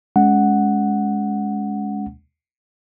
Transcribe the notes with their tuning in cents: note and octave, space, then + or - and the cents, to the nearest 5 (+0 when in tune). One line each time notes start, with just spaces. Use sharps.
G#3 +0 C#4 +20 F#5 +0